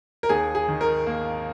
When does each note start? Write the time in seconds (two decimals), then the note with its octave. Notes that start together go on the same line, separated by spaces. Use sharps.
0.23 A#4
0.29 D#2 G#4
0.55 G#4
0.68 D#3
0.81 A#4
1.07 A#3